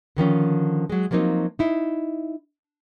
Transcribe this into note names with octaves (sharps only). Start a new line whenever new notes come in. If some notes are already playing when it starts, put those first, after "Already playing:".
D3 D#3 F3 C#4
F#3 G#3
F3 F#3 A#3 C4 D#4
D#4 E4